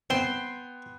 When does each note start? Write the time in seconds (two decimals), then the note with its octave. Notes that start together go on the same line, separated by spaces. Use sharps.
0.10 B3 C4 G5 C6